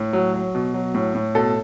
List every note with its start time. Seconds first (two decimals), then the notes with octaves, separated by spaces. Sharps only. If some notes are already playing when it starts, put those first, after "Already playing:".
Already playing: A2
0.13 F#3
0.34 F#3
0.55 B2
0.74 F#3
0.95 A2
1.15 A2
1.35 B2 A4